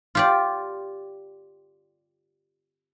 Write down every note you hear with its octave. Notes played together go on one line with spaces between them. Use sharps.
F4 G4 D5